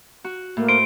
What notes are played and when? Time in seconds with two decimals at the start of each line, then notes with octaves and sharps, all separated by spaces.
0.24 F#4
0.57 A2 A#3
0.69 C5 D7